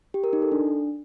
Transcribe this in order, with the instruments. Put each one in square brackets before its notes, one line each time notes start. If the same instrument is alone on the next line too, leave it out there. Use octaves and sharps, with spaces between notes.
[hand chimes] G4
A#4
D#4
A4
D4